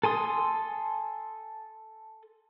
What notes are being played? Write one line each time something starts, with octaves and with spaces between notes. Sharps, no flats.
A4 G#5 C6 D#6